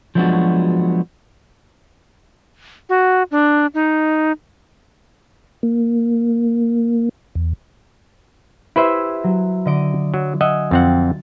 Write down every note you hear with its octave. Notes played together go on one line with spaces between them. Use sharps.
F3 F#3 G#3 B3 D4 F#4
F#4
D4
D#4
A#3
E2
E4 G4 B4 C5 E5 G#6
F#3
D3 D#5 D7
F#3
D#5 E5 F#5 G#5
F2 C4 F#5 A6